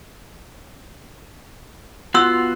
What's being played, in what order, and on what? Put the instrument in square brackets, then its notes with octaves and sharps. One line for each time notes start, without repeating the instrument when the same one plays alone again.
[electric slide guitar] B3 F4 F#4 [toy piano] C6 E6